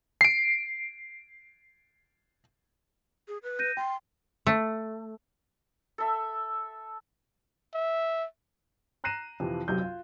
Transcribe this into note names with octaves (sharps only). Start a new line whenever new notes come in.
C7 D7
G#4
B4
G6 A#6 D#7
G5 C6
A3
A4 E5
E5
A#5 F#6 A#6 C7 D#7 E7
F2 C3 E3 F3
B1 F#2 C3 F#3 G6
F4